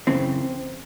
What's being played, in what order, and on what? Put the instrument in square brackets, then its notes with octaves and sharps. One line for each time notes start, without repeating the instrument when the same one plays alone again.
[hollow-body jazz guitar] F#2 C#3 E3 C4